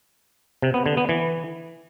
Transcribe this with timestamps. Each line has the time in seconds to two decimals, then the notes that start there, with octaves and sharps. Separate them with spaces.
0.62 C3
0.74 B3
0.86 D3
0.97 B3
1.09 E3